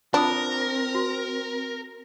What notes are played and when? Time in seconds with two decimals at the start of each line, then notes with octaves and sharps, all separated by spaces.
0.14 C4 D4 F4 A#4 D#6
0.95 F#4